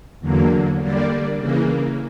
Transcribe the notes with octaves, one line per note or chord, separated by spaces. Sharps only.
E2 D3 F#3 A#3
D3 G3 A#3 D4
C#3 E3 A#3